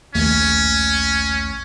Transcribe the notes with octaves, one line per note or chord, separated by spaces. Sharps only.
A#1 D#2 A3 C#4